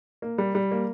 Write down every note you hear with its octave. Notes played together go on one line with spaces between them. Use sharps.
A#3
G3
G3
A#3